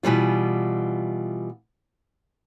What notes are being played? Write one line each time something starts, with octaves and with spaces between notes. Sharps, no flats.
B2 E3 G3 F4